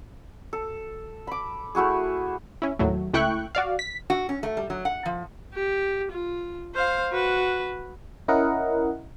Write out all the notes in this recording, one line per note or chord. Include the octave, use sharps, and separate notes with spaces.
A4
B5 D6
A3 E4 F#4 G#4
C#4 E4
D#2 A2 F#3 A3
C#2 A3 E4 G5 C#6 F#6
F#4 D5 F5
B6
F#4
C#4
A3
G3
F#3
F#5
F3
G4
F4
C5 F5
F#4 B4
C#4 E4 A#4 D#5 F#5